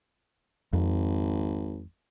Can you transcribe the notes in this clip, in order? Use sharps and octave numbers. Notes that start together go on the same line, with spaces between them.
G#1 F2